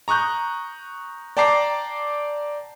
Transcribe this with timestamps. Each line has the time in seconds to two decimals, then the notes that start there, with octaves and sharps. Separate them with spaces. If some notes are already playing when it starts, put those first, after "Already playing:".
0.08 A#5 C#6 D#6 F#6 G6
1.37 D5 G5 A5 A#5 D6 C7